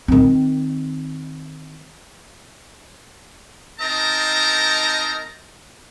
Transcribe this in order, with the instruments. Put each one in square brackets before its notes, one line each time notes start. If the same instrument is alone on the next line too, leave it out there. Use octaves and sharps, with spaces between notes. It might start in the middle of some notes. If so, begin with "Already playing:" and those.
[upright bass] D#3 C4
[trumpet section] C4 D#4 A#4 D#5 A5 A#5